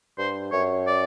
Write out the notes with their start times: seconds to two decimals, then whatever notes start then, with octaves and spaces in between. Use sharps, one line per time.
0.18 G2 C5
0.52 F#2 C#5
0.87 D5